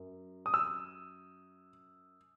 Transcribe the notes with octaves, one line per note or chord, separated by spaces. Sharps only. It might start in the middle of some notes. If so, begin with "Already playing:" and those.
Already playing: F#2
D#6
E6